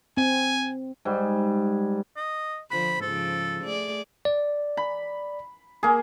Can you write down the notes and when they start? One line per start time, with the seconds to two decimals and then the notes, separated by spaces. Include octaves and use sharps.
0.17 C4 G#5
1.05 G#2 G3
2.17 D#5
2.71 D3 F3 C5 B5
3.01 G#2 C#3 F3 A4
3.64 A3 G#4 D5
4.25 D5
4.77 B5
5.83 A#3 G#4